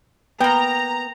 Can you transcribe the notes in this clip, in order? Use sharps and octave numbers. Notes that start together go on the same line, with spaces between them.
A#3 B3 G5 A#5